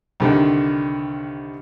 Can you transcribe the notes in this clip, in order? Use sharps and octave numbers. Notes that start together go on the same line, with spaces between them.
C2 D3 D#3